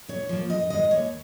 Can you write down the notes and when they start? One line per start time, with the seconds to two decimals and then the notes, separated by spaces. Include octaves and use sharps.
0.08 G#2 C#5
0.29 F3 A#3
0.49 F2 D#5
0.70 D#3 G#3 D#5
0.90 D#2 C#5